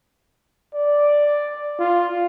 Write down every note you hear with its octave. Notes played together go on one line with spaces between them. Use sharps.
D5
F4